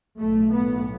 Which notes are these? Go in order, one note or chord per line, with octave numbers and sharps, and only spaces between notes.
B1 A2 A3
B3